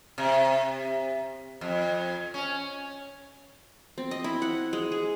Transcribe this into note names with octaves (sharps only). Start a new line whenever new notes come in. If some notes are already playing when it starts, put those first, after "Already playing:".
C3
F2
C#4
C4
D#5
E4
F#5
G#3
G#4